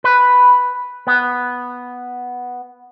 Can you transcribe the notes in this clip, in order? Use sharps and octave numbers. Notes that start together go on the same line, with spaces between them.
B4
B3